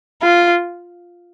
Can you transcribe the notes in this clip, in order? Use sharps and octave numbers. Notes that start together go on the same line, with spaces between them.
F4